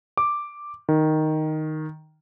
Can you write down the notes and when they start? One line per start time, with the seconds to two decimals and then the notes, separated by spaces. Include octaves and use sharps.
0.17 D6
0.89 D#3